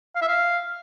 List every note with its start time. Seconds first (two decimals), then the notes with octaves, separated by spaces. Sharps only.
0.16 F5
0.22 E5
0.28 F5